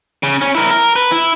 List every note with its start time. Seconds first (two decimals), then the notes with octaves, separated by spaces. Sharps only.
0.23 C#3
0.41 C#4
0.55 E4 A#4
0.71 A#4
0.96 B4
1.12 E4